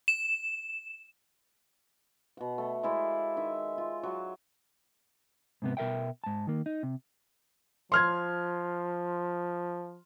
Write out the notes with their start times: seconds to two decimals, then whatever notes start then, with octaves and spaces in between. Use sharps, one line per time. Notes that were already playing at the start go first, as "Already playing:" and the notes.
0.08 E7
2.37 B2 F#5
2.58 A3
2.83 G#3 E4 D5 F5
3.37 D#3 E5
3.78 F4
4.03 F#3 F5
5.62 G#2 C3 B3
5.77 B2 A#4 E5 G5
6.24 G#2 A5
6.47 D#3 A#3
6.66 D#4
6.83 C3
7.92 F3 C6 F6 G#6